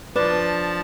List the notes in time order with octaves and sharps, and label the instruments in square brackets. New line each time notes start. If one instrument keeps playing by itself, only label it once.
[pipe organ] F3 A5 [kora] D4 [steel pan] B4